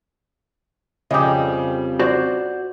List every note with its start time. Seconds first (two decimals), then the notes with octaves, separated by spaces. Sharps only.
1.11 F2 C#3 G3 G4 D#5
1.99 F#4 C5 D5